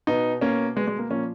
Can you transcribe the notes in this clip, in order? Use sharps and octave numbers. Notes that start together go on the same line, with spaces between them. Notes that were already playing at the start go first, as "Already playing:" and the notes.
B2 B3 D#4
B2 A#3 C#4
B2 G#3 B3
G#3
A#3
A#2 F3 A#3 C#4